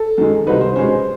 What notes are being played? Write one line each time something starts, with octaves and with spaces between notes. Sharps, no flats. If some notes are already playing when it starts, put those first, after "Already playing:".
Already playing: A4
F#2 D#3 G#3
C2 B2 G3 C4 D#4 B4
C5
B2 G#3 C#4 C5